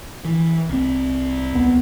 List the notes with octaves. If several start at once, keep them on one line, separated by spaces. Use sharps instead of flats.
E3
C2 C4
D#2 B3